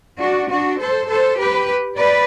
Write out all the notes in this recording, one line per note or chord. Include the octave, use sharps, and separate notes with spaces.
D4 F#4
D4 F#4
A4 C5
A4 C5
G4 B4
B4 D5